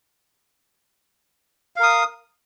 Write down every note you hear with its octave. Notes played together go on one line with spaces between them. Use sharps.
A#4 F5 D#6